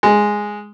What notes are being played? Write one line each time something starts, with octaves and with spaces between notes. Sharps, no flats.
G#3